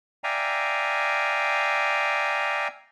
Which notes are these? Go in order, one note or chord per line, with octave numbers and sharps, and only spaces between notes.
D5 E5 F5 G5 G#5 A#5